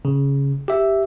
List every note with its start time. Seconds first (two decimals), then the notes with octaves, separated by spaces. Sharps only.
0.05 C#3
0.68 G4 E5